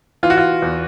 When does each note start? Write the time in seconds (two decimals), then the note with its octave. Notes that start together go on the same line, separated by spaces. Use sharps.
0.23 E3 F4
0.30 F#4
0.37 F4
0.62 E2